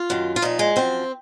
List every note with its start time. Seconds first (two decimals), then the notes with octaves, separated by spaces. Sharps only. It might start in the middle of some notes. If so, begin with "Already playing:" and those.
Already playing: F4
0.10 F#2 D#3
0.36 F4
0.42 A#2 F3 D#4
0.59 G#3
0.76 F#2 F3 C4